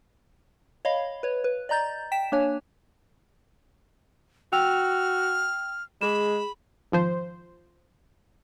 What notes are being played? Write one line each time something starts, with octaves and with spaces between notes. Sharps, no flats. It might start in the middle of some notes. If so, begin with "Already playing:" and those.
C#5 D#5 F5 B5
B4 C#5
B4
D5 D#5 A#5 G6 A6
G5 B6 E7
A#3 D4 C#5 G#5
F#4 G5 E6 F6 F7
G#3 G#4 B5 E7
G#1 F3 C5